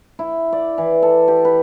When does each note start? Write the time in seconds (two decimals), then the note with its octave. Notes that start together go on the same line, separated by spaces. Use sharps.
0.19 E4
0.53 D5
0.78 E3
1.03 A4
1.28 G4
1.45 B4